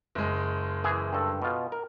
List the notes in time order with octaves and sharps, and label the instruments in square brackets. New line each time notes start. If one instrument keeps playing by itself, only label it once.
[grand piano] F#1 G#3
[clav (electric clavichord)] E3 G#4
G2 A4
B2 F4
A#4